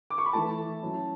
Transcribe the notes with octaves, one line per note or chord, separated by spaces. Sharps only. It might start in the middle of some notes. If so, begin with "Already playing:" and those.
D6
C#6
B5
E3 A3 E4 A5
F#3 C#4 E4